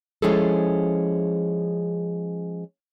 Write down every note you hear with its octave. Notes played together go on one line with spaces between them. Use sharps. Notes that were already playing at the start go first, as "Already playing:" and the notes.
F3 G#3 C#4 E4 G#4 A4